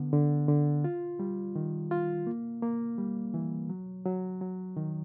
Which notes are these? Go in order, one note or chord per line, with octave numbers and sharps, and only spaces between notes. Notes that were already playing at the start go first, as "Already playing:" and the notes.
Already playing: D3 B3
D3
D3
F4
G3
D#3
F4
A#3
A#3
G3
E3
F#3
F#3
F#3
D#3